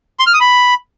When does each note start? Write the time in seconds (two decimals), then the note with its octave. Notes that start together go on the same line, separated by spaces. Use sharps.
0.20 C6
0.27 F6
0.33 D#6
0.40 B5